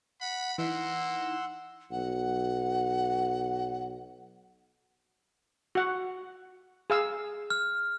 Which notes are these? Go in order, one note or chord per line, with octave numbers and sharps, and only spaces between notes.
F#5 B5
E3 A#3 D#4 F#5 C6 E6
B1 F#5
F#4 F#5
G#4 F5 E6
F6